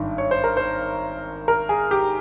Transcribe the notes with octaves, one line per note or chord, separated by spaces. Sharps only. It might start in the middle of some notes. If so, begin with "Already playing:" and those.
Already playing: G#1 G2 D#3
C#5
C5
A#4
C5
A#4
G#4
G4